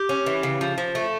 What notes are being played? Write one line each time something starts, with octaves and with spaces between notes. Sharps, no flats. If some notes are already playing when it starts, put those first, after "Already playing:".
Already playing: G4
C#4
E3
C#3
F3
F3
A3